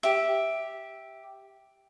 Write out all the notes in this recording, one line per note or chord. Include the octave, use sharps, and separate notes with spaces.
G4 E5